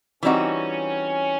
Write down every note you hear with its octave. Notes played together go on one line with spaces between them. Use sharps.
E3 G3 C4 C#4 D#4 F#4